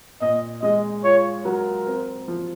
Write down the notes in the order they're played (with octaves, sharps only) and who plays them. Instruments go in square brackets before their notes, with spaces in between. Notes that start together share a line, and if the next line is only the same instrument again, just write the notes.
[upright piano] A#2 [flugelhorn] D#5
[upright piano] G#3 [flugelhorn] D#5
[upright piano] F4 [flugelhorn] C#5
[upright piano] F#3 [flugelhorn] A#4
[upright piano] C4
F3